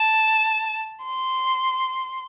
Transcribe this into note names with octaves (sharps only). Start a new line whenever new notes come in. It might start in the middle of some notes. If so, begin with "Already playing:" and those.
Already playing: A5
C6